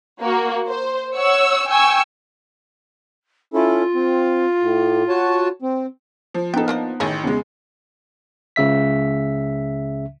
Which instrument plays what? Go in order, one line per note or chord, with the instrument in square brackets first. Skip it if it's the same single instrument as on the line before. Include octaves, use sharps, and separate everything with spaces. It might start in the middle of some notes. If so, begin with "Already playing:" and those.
[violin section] A#3 F#4
C5
C#5 F#5 C#6 E6
G5 G#5 C#6 E6
[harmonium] C#4 E4 A4 [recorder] F4
[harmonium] C4
A2
F#4 C#5 A5
C4
[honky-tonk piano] F3
[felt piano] B3 D#4 [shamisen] A4 G5
[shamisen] A#3 D4 D#5
[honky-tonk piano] A1 D#3 [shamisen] E4 G#4 C#5
[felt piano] E2 [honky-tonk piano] C#3 G#3
[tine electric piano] C#2 C#3 E5 B6